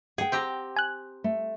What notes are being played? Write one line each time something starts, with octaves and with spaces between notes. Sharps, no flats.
G#4 F#5 G5
C4 G4 A#5
G#5 F#6
A3